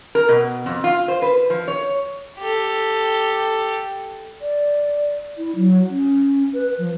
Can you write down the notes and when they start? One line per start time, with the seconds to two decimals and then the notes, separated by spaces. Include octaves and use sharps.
0.15 A#4
0.29 B2
0.66 F2
0.84 F4
1.08 C5
1.22 B4
1.50 F3
1.68 C#5
2.38 G4 A4
4.41 D5
5.37 E4
5.56 F#3
5.90 C#4
6.53 B4
6.78 F3